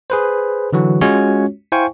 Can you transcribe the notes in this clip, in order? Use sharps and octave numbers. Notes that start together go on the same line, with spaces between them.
G#4 B4 C5
D3 E3 F#3 F#4
G#3 C#4 F4 F#4 C#5
E4 C5 F5 G5 G#5 C#6